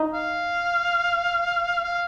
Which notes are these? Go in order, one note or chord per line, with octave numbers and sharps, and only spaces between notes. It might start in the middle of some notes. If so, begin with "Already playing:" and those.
Already playing: D#4
F5
F5